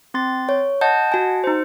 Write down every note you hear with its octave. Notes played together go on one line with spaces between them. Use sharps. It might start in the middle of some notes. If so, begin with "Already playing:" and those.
C4 C6 A6
C#5
D#5 F#5 A5 G6
F#4 G#5
D#4 C5